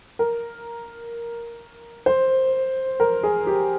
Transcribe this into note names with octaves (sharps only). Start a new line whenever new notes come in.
A#4
C5
A#4
G#4
G4